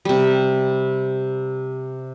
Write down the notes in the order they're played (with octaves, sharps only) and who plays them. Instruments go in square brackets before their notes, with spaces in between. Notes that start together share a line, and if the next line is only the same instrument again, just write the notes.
[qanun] C3 G3